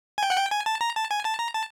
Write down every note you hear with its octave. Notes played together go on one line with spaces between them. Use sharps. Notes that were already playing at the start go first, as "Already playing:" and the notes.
G#5
G5
F#5
G5
G#5
A5
A#5
A5
G#5
A5
A#5
A5